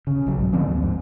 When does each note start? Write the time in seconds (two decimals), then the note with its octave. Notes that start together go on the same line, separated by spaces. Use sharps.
0.07 C#3
0.26 B1 F#3
0.40 G#2
0.52 D3 F3 C4
0.66 D1 D#2
0.83 G#2